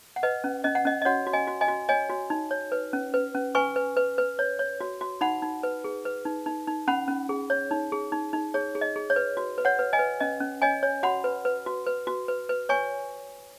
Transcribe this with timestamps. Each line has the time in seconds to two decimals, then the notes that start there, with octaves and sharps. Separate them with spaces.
0.16 F#5
0.23 B4 D#5
0.44 C#4
0.64 C#4 D#5
0.75 F#5
0.85 C#4 D#5
1.02 D#5
1.05 F#4 C#5 F#5
1.27 F#4
1.33 D#5 G#5
1.47 F#4
1.61 D#5 G#5
1.68 F#4
1.89 C#5 D#5 G#5
2.10 F#4
2.30 D#4
2.51 C#5
2.72 B4
2.93 C#4
3.14 B4
3.35 C#4
3.55 B4 G#5 C#6
3.76 B4
3.97 B4
4.18 B4
4.39 C#5
4.59 C#5
4.81 F#4
5.01 F#4
5.21 D#4 F#5 B5
5.42 D#4
5.63 B4
5.84 G#4
6.05 B4
6.25 D#4
6.46 D#4
6.67 D#4
6.88 C#4 F#5 B5
7.08 C#4
7.29 G#4
7.50 C#5
7.71 D#4
7.92 G#4
8.12 D#4
8.33 D#4
8.54 G#4 C#5
8.75 G#4
8.81 D#5
8.96 G#4
9.10 C#5
9.16 B4
9.37 F#4
9.58 B4
9.65 C#5 F#5
9.79 B4
9.93 D#5 G#5
9.99 B4
10.20 C#4 D#5
10.40 C#4
10.62 C#5 D#5 G#5
10.83 C#5
11.03 F#4 F#5 B5
11.24 B4
11.45 B4
11.66 F#4
11.86 B4
12.07 F#4
12.28 B4
12.49 B4
12.69 C#5 G#5 C#6